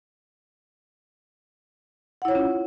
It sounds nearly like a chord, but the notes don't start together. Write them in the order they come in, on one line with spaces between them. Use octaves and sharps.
F#5 E4 C#5 F4 C#4